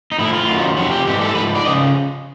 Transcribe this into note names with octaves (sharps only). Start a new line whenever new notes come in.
D#4
A2 F3 E4
F4
F#2 D#3 F#3
F2 C3 F3 F#4
G4
G#2 E3 G3 G4
A4
G#2 F3 B4
D5
C#3 F3 D#5